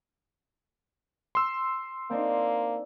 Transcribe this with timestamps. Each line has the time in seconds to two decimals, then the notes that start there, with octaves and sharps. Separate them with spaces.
1.35 C6 E6
2.10 A#3 C4 D4 D#4